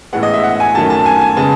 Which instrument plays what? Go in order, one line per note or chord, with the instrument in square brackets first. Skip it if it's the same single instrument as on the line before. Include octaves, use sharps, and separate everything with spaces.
[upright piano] A1 A2 G#3 B3 F#5
D#5
E5
F#5
G#5
F#2 D#3 F#3 A3 A5
A5
G#5
G#5
C#3 G#3 B3 A5